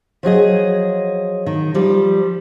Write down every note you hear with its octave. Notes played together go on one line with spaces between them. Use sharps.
F3 F#3 G#4 D#5
D#3
F3 G3